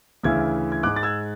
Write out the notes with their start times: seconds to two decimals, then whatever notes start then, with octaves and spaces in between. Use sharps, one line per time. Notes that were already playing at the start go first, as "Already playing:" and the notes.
0.23 D2 C#3 E3 E6 G#6
0.72 G#6
0.83 G#2 G#3 D6 F#6
0.96 A6
1.03 E6 G#6